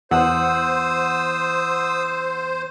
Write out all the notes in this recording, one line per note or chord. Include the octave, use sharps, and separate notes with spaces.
E2 C5 F#5 D#6 E6